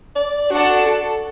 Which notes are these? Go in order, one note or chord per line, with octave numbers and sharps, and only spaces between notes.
D5
D4 F#4 A4 D5 F#5 A5
A4